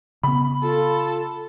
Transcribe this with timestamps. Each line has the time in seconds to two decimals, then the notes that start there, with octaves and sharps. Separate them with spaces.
0.23 C#3 B3 B5
0.63 F4 A4